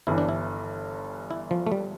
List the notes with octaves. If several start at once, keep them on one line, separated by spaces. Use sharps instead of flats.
G1 G2 E3 E4
D4
E4
E4
F3
A3
G3